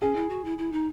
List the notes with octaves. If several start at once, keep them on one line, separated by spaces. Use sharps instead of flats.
C#4 G#4
E4
F#4
E4
E4
D#4